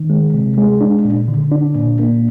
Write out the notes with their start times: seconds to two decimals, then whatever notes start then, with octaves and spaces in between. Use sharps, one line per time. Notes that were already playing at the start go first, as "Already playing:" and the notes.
Already playing: D#3
0.10 G#3
0.34 C3
0.58 G#3
0.81 D4
1.05 A#2
1.28 D3
1.52 D4
1.76 A#2
1.99 A#3